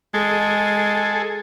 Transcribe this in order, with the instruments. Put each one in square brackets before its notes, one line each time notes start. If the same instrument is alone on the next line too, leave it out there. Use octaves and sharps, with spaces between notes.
[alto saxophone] G#3 [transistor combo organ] G#4 A4